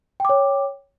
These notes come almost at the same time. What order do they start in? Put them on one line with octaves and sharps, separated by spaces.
G5 D6 C#5